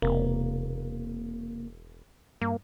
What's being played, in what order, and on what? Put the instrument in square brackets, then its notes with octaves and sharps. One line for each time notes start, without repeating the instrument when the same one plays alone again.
[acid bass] E1 [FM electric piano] C3 A#3
[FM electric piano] G2 [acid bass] A#3